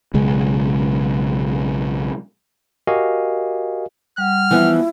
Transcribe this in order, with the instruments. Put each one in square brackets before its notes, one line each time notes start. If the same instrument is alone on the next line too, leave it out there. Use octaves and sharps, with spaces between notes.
[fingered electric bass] B1 C#3 G#3
[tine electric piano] F#4 G4 A#4 D#5 F5 G#5
[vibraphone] G3 F#5 [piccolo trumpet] F6
[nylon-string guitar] E3 F3 B3 [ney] E4